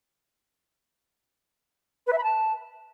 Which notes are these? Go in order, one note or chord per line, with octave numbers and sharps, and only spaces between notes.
B4
E5
B5
A5